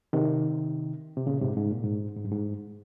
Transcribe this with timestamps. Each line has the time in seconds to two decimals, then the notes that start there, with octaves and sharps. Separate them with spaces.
0.13 C3 D#3
1.17 C3
1.26 A#2 C#3
1.41 G#2 C3
1.57 G#2
1.71 A#2
1.84 G#2
2.17 G#2
2.25 G2
2.31 G#2